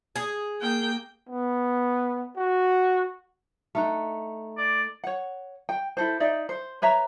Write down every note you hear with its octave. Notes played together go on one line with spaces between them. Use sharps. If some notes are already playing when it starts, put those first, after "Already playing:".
G#4
A#3 G5
B3
F#4
A3 D#4 F#5
D5
C#5 F#5
G5
E4 A4 C5
D#4 D5 E5
C5
B4 C#5 E5 A#5